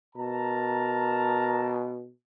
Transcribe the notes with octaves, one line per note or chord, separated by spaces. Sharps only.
B2 A#4 A5 A#5